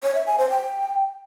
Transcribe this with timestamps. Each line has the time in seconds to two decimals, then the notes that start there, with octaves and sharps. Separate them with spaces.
0.03 C#5
0.15 E5
0.27 G#5
0.38 C5
0.50 G5